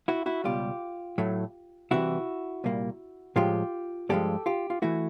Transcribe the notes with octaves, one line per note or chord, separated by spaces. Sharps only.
E4 F#4
E4 F#4
C#2 B2 G3 F4 G4
A2 F#3 A3
C2 C3 E3 E4 F#4
C2 A#2 G3 A#3
A2 F3 G#3 F4 G4
G2 D3 F3 G#3 G4 A4
F4 G4
F4
E3 A3 E4 F#4